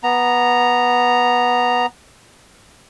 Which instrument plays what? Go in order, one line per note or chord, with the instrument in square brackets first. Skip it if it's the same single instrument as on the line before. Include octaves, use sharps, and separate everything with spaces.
[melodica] B3 A#5